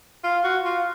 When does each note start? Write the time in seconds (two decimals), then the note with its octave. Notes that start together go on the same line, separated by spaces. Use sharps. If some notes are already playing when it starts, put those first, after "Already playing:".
0.24 F4
0.44 F#4
0.65 F4